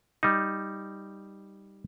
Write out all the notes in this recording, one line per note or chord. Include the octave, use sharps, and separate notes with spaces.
G3 D#4